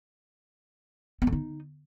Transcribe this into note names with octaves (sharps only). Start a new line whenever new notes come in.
B3
D3
D#4